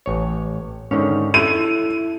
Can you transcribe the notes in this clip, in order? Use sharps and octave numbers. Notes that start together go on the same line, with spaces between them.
A1 C#5
G#2 D3 D#3 C#4
E4 A4 D#7